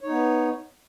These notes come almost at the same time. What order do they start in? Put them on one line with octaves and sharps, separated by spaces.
C#5 D#4 B3